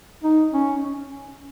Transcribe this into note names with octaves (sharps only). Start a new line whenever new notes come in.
D#4
C#4
C#4